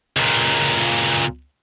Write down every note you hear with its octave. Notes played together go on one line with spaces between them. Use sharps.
C#2 A#2